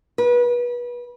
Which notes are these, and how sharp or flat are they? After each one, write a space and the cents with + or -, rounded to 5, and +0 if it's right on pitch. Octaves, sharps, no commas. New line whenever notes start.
B4 -30